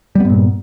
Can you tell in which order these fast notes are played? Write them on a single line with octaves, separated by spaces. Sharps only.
G3 B3 G2 A#2